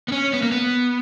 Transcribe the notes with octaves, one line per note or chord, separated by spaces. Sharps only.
B3
C#4
B3
A#3
B3